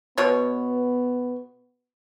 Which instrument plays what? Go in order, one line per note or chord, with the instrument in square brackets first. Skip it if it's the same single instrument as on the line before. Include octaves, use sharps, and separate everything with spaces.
[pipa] B2 C#5 [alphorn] B3